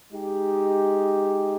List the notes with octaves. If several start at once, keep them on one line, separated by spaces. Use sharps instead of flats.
G#3 D#4 G4